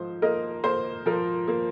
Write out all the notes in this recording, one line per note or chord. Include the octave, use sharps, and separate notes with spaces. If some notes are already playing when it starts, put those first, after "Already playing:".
Already playing: G#2 F3 C5
A#3 A#4 D#5
A#3 C5
F3 A#4
A#3